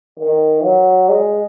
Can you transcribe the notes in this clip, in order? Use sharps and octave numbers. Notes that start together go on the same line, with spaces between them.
D#3
F#3
G#3